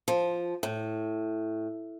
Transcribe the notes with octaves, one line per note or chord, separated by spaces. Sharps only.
F3
A2